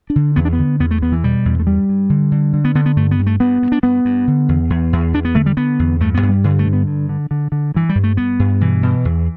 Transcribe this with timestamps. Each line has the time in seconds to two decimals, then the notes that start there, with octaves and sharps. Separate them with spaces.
0.10 D4
0.16 D3
0.36 E2 B3
0.45 D4
0.53 B3
0.58 D3
0.80 E2 B3
0.91 A3
1.02 E2 B3
1.12 E3
1.24 B2 G3
1.45 E2
1.60 A3
1.67 G2 G3
1.89 G2
2.10 D3
2.32 D3
2.53 D3
2.65 B3
2.75 D3 B3
2.86 B3
2.96 G2 A3
3.11 B3
3.19 G2
3.27 A3
3.40 G2 B3
3.62 G2
3.72 D4
3.83 G2 B3
4.05 G2
4.27 D3
4.49 E2
4.70 E2
4.93 E2
5.14 E2 D4
5.25 B3
5.35 D3 A3
5.46 G3
5.57 D3 B3
5.79 E2
6.00 G2 A3
6.15 B3
6.23 G2
6.29 G3
6.44 G2 D3
6.59 A3
6.66 D3
6.73 B3
6.87 G2
7.09 D3
7.31 D3
7.52 D3
7.74 G2 E3
7.89 G3
7.95 G2
8.04 A3
8.17 G2 B3
8.39 G2
8.61 B2 E3
8.83 B2
9.05 E2